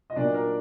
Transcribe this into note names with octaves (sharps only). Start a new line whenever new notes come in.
D#5
A#2 F#3 A#3 D4 D#4 D5
A#4